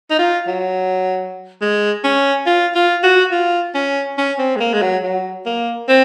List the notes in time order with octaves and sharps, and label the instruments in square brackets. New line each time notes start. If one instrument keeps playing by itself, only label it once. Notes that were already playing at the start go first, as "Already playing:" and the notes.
[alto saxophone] D#4
F4
F#3
G#3
C#4
F4
F4
F#4
F4
C#4
C#4
C4
G#3
A#3
G#3
F#3
F#3
A#3
C4